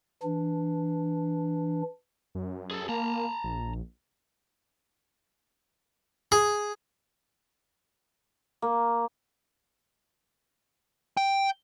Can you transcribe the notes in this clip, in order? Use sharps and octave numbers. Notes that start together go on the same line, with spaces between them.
E3 D4
F#2
G#4 A4
A#3 A5 A#5
A#1
G#4
A#3
G5